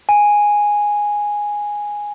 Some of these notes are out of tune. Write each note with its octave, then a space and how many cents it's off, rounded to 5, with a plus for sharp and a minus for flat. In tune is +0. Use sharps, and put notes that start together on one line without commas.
G#5 -5